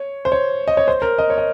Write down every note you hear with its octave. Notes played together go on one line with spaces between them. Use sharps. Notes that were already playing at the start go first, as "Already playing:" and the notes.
Already playing: C#5
C5
C#5
D#5
C#5
C5
A#4
D#5
C#5
D#5